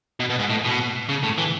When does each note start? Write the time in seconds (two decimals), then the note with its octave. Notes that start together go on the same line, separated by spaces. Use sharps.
0.20 B2
0.30 B2
0.39 G#2
0.50 A2
0.65 B2
1.09 C#3
1.23 A2
1.38 E3